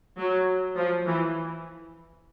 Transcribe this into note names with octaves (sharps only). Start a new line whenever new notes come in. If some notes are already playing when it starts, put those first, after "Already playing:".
F#3
F3
E3